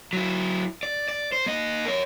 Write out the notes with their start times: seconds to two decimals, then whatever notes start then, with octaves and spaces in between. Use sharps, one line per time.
0.13 F#3 E4
0.83 D5
1.08 D5
1.32 C5
1.46 A#3 D#5
1.85 A#4 C#5